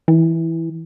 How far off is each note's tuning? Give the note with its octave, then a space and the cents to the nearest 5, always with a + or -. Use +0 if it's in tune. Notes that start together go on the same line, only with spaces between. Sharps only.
E3 -5